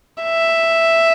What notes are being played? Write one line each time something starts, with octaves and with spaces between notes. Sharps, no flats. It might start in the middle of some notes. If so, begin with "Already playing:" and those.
E5